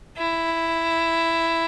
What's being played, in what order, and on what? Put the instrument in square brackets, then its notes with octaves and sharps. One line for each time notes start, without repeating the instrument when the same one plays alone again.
[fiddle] E4